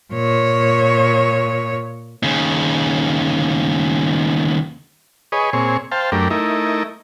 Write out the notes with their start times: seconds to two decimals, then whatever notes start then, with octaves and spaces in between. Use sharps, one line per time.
0.13 A#2 C#5
2.23 D#2 C#3
5.32 G#4 B4 C#5 D#5
5.53 A#2 C4 G#4 C#5
5.92 C5 F5 G5 A5
6.12 F#2 A3 D4 G4 A#4
6.31 A3 D#4 E4 A#4